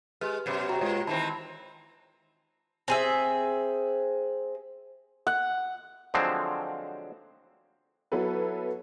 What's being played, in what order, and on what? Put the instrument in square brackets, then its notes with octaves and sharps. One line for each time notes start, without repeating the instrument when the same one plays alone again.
[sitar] G#3 [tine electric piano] G4 B4 [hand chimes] F6
[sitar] F#2 B2
[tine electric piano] F#4 [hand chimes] G4 G5 A#5
[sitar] A#2 [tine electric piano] G#3 F4 C#5
[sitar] D#3 E3 C4 [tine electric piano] A5 [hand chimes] B5
[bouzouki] C4 G#4 E5
[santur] F#5
[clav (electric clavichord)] D3 F3 F#3 G#3 C4
[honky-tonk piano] F#3 B3 E4 A4 B4